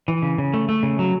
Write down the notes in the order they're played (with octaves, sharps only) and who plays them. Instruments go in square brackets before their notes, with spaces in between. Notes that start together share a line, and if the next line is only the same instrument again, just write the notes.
[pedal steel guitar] E3
C#3
C#3
A3
A3
C#3
F#3